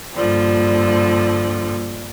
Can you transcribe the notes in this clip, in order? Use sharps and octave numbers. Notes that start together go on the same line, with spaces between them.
G2 A#2 D3 F3 G3